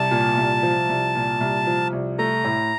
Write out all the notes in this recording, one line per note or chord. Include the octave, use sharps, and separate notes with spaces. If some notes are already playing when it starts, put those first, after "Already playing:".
Already playing: C2 A5
A#2
C2
F3
C2
A#2
C2
F3
C2
A3 A#5
A2